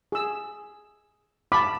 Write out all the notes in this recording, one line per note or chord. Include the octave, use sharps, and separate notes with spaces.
G#4 E6
A5 B5 D6